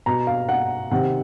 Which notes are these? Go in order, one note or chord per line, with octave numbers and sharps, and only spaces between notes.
B2 A#5
F5
F#5
C3 D#3 F#5